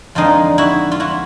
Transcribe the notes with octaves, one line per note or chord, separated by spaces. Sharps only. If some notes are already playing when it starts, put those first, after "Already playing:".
F2 D3 F3 G#3 D#4 F4
E4 F#4
F4
E4 F#4